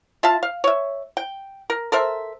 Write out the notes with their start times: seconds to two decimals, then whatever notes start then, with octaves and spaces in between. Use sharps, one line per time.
0.23 F4 E5 F5 A5
0.43 F5
0.64 C#5 E5
1.17 G5
1.70 A#4
1.92 A4 A#4 C5 E5